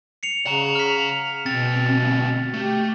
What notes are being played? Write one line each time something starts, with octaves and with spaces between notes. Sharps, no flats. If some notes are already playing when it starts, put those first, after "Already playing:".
C7 C#7 F7
C#3 F#5 A#5
F6 B6
D2 B2 C4 A6
A3 G4